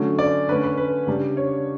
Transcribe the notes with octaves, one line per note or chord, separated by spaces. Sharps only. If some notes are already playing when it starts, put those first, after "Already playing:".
Already playing: D3 F#3 A3 C#4
D5
D3 A3 C#4 B4
B4
B4
C#3 G3 D4
C#5